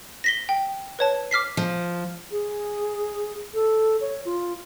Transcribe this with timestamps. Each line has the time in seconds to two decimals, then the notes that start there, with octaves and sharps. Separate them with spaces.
0.24 A#6 B6 G7
0.49 G5
0.99 B4 C#5 A5
1.31 D6 F6 B6 C7
1.57 F3
2.31 G#4
3.54 A4
4.01 C#5
4.25 F4